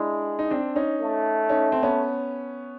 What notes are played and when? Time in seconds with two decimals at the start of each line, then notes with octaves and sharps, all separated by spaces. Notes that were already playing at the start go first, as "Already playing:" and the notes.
Already playing: G#3 D4 E4
0.39 D#4
0.50 C4 D4
0.76 C#4 D#4
1.00 A3
1.49 C#4 D#4
1.72 C4
1.83 B3 C#4